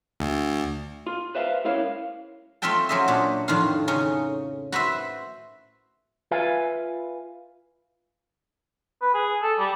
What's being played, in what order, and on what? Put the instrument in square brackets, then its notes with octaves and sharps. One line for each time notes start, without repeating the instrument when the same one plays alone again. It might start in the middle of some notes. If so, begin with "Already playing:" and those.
[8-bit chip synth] D2
[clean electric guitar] F4
B4 C5 E5 F5 G5 A#5
G#2 C#4 E4 A#4 C#5 F5
[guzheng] A3 C4 F4 E5 G5 A5
F#3 C#4 C5 D#5 E5
A#2 D4 C#5
F2 A2 D#3 D4 F4 F5
C#3 C#4 D#4
F#4 B4 C5 E5
[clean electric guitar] F4 B4 E5 F5 G#5
[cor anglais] B4
G#4
A4
G3